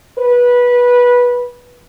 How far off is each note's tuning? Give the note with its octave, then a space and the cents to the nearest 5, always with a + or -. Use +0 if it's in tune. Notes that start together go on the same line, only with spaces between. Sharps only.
B4 -15